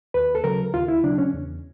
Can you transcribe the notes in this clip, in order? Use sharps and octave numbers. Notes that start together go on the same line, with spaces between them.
D#2 B4
A4
C#3 F#3 A#4
D#2 F4
E4
C#3 F#3 D4
C#4
E2